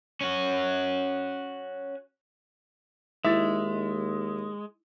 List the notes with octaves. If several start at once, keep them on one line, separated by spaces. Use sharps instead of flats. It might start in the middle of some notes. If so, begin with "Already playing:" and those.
C#4 F#4
D#2 G#3 D#4 E4 E5 A6